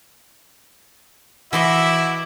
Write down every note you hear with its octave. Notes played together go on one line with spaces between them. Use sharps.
E3 E4 F#4 C5 D#5 E5 D6